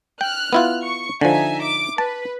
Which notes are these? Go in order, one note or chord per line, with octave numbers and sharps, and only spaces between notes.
G5 F6 F#6
B3 E4 F4
C#6
D3 F3 D#4 E5 G#5
D6
B4 A5